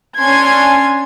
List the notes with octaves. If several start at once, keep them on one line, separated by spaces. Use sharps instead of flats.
C#4 D4 G#5 C6 G#6